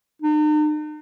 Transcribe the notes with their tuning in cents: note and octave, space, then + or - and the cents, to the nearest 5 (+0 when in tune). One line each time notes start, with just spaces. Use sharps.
D#4 -45